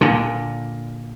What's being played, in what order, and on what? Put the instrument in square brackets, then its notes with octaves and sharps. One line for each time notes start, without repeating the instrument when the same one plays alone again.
[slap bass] A#2 D3